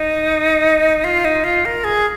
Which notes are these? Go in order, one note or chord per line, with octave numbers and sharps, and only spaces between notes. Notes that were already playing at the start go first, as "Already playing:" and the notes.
Already playing: D#4
F4
D#4
F4
A#4
G#4